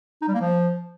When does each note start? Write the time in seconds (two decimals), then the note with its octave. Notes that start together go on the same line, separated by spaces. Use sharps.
0.22 D#4
0.28 G3
0.34 A#3
0.41 F3